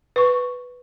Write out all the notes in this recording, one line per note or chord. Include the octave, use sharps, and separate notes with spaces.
B4 C#6